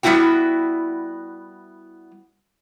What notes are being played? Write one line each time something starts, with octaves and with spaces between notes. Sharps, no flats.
G3 B3 D#4 E4 F#4 G5